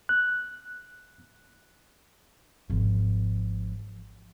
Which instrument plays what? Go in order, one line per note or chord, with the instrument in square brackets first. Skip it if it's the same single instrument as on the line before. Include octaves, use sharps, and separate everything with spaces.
[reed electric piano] F#6
[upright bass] G#1 F3